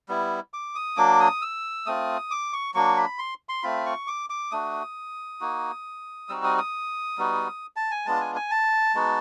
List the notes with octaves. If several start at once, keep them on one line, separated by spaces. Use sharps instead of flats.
G3 B3 E4
D6
D#6
F#3 A#3 D4 D6
D#6
E6
A3 C4 F4 D#6
D6
C#6
F#3 A#3 D4 C#6
B5
C6
C6
A3 C4 F4 B5
C#6
D6
D6
A3 D4 F#4 D#6
A#3 D#4 F#4
G3 C4 D#4 F#4 E6
D#6
D#6
G3 B3 D#4 F#4
A5
G#5
G#3 B3 D4 F4 A5
G#5
G#5
A5
G#3 B3 D#4 F#4